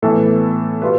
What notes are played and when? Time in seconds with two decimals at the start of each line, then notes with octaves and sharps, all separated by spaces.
0.02 A2 E3 B3 A4
0.82 B2 G3 B3 F4 B4